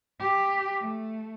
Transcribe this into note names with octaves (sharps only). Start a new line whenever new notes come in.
G4
A3